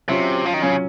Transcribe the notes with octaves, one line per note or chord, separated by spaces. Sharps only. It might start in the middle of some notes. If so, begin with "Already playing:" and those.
C3 F#3 C#4 F4
F3
D#3
C#3 F#3 C#4 F4